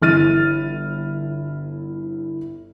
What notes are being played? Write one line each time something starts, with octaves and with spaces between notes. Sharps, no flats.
G1 E4 F6 A6 D#7